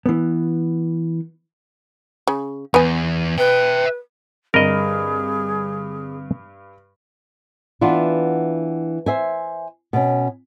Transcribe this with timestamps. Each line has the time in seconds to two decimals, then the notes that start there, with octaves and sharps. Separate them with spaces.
0.06 E3 B3
2.27 C#3
2.74 E2 B3 G#5
3.38 B4 E5 G5
4.54 G2 D3 G3 C4 G#4 A#4 D#5
7.81 E3 B3 D4 F4
9.06 C5 E5 G#5
9.93 B2 C#4